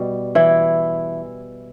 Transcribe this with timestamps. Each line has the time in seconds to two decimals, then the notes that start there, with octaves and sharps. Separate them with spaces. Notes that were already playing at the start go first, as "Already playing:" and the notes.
Already playing: B2 G3
0.35 E3 E4